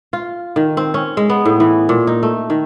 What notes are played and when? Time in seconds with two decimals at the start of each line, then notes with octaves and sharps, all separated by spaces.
0.13 F4
0.56 D#3
0.77 C4
0.94 C#4
1.17 G#3
1.29 B3
1.45 A2
1.60 E3
1.89 A#2
2.07 D#4
2.23 A3
2.50 D#3